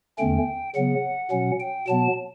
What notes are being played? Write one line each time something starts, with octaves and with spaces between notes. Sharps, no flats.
E2 D3 A3 C#4 G5
C#3 F#3 B3 F#5
B2 F#3 C#4
G5
B2 F#3 B3 A5